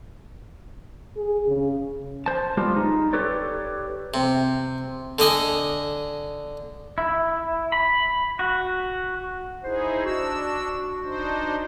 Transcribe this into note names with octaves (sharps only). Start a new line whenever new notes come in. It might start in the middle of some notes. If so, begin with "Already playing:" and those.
G#4
C#3
C5 A5
G3 G#3 B3 F4 G4
D#4
G4 A4 B4 C#5 D5
C3
D3 D4 D#5 G#5
E4
B5
F#4
D#4 E4 G#4 C5
D4 F#4 E6
D4 D#4 C5